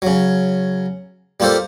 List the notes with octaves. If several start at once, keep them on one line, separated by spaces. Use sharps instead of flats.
C#3 F#3
G3 A#3 F4 G4 A4 C5